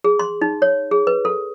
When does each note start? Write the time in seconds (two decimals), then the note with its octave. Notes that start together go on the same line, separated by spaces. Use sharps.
0.04 G#4
0.19 C6
0.42 D#4
0.62 C#5
0.91 G#4
1.07 B4
1.25 A4